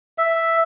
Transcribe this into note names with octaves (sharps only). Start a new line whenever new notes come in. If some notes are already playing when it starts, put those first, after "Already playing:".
E5